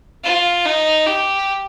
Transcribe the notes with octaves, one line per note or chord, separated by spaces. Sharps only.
F4
D#4
G4